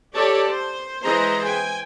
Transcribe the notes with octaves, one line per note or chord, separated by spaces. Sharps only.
G4 A4 C#5 D5 A5
C5
E3 G#3 G#4 C5 D#5 A#5
G5 G#5